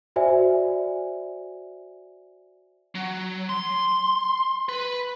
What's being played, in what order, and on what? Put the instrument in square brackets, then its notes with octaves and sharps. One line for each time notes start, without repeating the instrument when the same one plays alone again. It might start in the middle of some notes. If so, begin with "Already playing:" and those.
[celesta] F#4 C5 D5 E5 G#5
[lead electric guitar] F#3
C6
B4